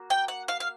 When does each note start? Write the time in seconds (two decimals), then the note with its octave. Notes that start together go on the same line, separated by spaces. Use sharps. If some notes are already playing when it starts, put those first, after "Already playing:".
Already playing: A#3 F#4
0.10 G5
0.28 F#5
0.48 F5
0.60 F5